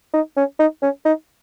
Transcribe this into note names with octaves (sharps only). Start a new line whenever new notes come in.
D#4
C#4
D#4
C#4
D#4